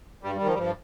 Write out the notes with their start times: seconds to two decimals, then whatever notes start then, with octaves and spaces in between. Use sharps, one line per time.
0.23 G2 G3
0.35 G3
0.40 D#3
0.47 F3
0.54 G3
0.58 G2 F3